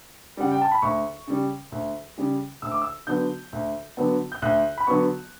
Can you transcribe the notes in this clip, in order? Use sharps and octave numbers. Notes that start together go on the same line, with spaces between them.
C#3 G3 F#5
G5
A5
B5
D2 C#6
C#3 G3
D2
C#3 G3
D2 E6
D6
E6
D3 F#3 B3 G6
D2
D3 F#3 B3
G6
D2 F#6
B5
D3 F#3 B3 C#6